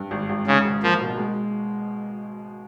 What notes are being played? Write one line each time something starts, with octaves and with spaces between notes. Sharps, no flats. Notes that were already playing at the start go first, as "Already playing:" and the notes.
Already playing: G2
G#1
G#1
G#2 C#3
G#1
F3 A#3
B2
G#3